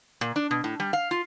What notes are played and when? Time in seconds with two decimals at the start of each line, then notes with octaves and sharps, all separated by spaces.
0.21 A#2
0.36 D4
0.51 B2
0.64 A2
0.80 G3
0.93 F5
1.11 F4